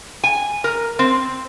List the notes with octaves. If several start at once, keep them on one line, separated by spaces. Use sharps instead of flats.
G#5
A#4
C4